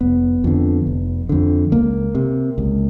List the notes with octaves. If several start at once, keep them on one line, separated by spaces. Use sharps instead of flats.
F1 B3
F2 D3
F1
F2 D3
C#2 A#3
C3
C#2